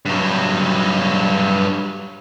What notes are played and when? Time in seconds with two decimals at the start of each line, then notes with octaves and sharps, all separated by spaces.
0.05 G2 F#3